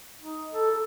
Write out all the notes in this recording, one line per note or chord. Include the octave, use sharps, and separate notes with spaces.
D#4
A4
A4